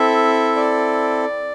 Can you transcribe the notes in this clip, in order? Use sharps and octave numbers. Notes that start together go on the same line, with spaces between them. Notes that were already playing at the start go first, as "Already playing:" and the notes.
Already playing: C4 E4 A4 E5
D5